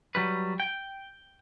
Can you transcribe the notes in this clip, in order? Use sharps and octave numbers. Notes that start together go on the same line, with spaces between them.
F#3 G3 B4
G5